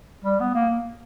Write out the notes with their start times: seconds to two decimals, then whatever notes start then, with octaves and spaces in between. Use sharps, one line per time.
0.25 G3
0.40 B3
0.55 A#3